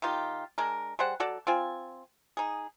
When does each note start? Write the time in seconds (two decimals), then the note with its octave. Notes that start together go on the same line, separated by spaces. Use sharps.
0.02 D#3 D#4 F4 G4
0.58 G#3 D4 A#4
0.99 G3 G#4 C5 F#5
1.20 F#3 F#4 A4 D5
1.47 C4 F4 G#5
2.37 D#4 G#4